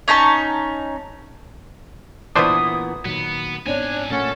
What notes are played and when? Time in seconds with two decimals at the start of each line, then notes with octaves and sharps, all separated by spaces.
0.08 C#4 D#4 A5 C#6
2.36 A#2 E3 B3 D4 C5 D#6
3.05 A#2 D#3 F#3 B3
3.66 G#2 F3 B3 C4 D4 C#5 G#5
4.10 A#2 A3 A#3 C#4 A4 F#5